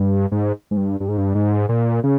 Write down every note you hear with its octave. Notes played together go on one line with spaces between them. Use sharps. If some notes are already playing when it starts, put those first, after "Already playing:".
Already playing: G2
G#2
G#2
G2
G2
G#2
G2
G#2
A#2
C#3